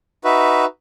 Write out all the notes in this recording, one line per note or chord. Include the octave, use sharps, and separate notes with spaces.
D#4 F#4 B4 E5